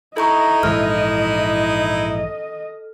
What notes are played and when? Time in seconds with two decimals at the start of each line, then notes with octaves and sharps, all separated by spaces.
0.17 D#4 E4 A4 D#5 A#5 C#6
0.63 A#1 G#2 E3 A4 F6